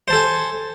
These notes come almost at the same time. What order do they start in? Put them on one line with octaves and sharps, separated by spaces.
C5 A5 A4 G#5